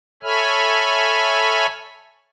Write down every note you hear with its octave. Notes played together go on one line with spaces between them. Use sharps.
A4 C#5 E5 G#5 B5 F6